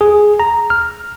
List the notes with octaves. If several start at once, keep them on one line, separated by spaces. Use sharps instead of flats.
G#4
A#5
F6